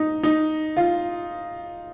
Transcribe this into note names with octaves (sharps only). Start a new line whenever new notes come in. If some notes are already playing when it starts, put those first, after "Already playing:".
Already playing: D#4
D#4
F4